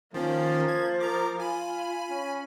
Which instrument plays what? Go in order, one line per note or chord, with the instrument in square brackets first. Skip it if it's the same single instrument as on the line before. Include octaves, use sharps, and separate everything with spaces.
[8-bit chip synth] D#3 C#4 [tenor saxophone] F3 [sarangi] A#3
[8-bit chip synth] G#6
[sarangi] A#4 [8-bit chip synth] A#5 D6
[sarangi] F4 [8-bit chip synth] G#5 B5
[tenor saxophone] C#4